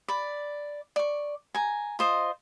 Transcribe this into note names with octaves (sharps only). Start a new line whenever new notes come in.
D5 B5
D5 C#6
G#5 A#5
F4 C5 D#5